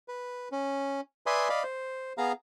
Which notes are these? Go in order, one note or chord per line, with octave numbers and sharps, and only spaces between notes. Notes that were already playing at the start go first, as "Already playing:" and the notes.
B4
C#4
B4 D5 E5 G#5 C6 D#6
D5 D#5 F5 B5
C5
B3 G#4 F5 A#5